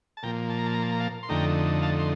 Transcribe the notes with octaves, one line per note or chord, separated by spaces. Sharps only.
A5
A#2 F3 A#3 G5 A#5
A5
A#5
A5
A#5
A5
A#5
F5 A5
C6
F2 D3 A3 D#4 G5 A#5
F5 A5
C6